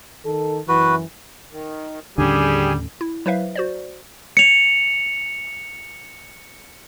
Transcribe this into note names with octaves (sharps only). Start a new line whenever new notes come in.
D#3 A4
F#2 E3 F#4 B4
D#3
D#2 A2 D3 G3 C#4 G4 G#4 G#5
E4
F#3 E4 B4 C5 E5 F5
F#4 C5 D5
C#7 F7